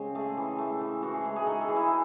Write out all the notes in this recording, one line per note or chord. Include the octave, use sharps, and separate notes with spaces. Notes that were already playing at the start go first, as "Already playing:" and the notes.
Already playing: C#3 G#3 C4
A3 G#4
E3
A3
E3
E3 F#4
G#4
G#3 G#4
G#4
D#4 A4
G#4
E3
E4